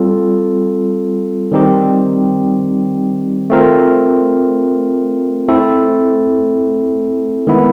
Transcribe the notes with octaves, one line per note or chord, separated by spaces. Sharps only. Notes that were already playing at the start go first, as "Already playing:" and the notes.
Already playing: G3 C4 F4 A4
D#3 G3 C4 D#4 G4
A3 C4 F4 A#4
A3 C4 E4 A4
D#3 G#3 B3 E4